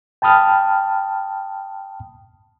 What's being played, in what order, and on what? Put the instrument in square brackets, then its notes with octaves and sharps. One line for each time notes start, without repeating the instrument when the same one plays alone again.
[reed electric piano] G5 A5 B5 D#6 F6